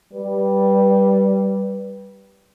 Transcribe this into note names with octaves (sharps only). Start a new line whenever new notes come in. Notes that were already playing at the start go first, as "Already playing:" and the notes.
G3 B4